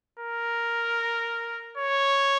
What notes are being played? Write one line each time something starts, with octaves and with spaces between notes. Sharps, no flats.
A#4
C#5